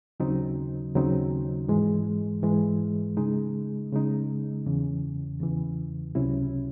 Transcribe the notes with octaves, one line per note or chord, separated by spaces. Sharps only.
D#2 C#3 F#3 C4 D#4
D#2 C#3 F#3 C4 D#4
G#2 E3 G#3
G#2 E3 G#3
C#3 G#3 D#4
C#3 G#3 D#4
E2 C#3 E3
E2 C#3 E3
C#2 C3 F#3 C#4 E4